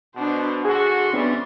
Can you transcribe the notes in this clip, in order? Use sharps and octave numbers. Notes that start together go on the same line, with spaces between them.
B2 D4 C5
D3 F#4 G#4 C6 C#6
F2 E3 G3 B3 C#4 D4